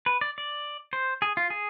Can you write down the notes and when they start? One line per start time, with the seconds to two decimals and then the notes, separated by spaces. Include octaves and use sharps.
0.06 B4
0.21 D5
0.38 D5
0.93 C5
1.22 G#4
1.37 F4
1.50 G#4